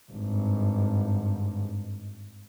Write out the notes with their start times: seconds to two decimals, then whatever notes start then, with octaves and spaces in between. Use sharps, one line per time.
0.12 G#1 G2